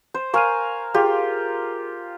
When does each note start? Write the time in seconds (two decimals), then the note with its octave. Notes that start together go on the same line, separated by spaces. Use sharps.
0.14 C5
0.34 A#4 F5 G#5 C#6 F6 D#7
0.94 F4 G4 G#4 D6